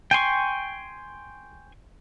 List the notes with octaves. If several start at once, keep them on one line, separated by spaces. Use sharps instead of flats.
G5 G#5 C6 C#6